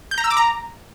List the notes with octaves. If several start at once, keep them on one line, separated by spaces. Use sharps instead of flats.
G6
A#5
E6
D6
A#5